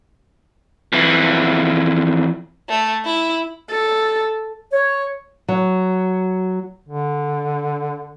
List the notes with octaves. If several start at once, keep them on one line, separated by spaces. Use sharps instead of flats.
F2 E3
A3
E4
A4
C#5
F#3
D3